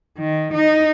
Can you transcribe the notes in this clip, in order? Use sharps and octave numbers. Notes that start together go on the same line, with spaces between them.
D#3
D#4